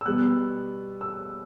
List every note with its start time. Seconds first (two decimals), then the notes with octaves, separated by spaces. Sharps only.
0.01 E6
0.06 B2 G3 B3 F#6
1.01 E6